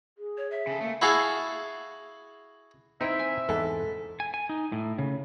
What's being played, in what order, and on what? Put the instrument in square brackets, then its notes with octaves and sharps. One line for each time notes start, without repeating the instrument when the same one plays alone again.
[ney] G#4
[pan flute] C#5
E5
[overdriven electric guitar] C#3 A4
[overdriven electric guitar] A3 [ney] A#3
[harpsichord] E4 F#4 G#4 A4 F5 G#5
[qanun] C4 G5 [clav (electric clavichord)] D#4 E4 [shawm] E5
[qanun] G#5
[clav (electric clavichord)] E2 G#2 E3 [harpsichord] A4
[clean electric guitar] G#5
G#5
D#4
A2
C#3